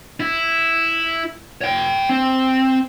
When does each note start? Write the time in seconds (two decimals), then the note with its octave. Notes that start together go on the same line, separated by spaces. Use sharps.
0.20 E4
1.61 C#5 G5
2.09 C4